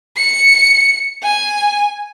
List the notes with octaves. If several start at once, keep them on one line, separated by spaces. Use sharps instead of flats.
C#7
G#5